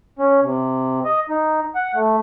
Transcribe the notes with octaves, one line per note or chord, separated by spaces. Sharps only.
C#4
C3
D#5
D#4
F#5
A3